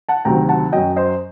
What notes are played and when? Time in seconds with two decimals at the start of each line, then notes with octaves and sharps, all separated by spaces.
0.09 F#5 A5
0.25 D2 C3 D#3 F#3 G5 A#5
0.49 F#5 A5
0.72 F#2 F#3 D#5 G5
0.96 C5 D#5